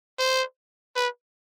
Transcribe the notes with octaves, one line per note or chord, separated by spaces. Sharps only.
C5
B4